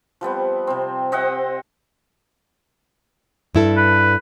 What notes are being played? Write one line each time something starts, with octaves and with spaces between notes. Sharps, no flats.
F3 G3 B3 C4
C3 C4
C4 D#5 E5 F#5
G2 E4 A4
B4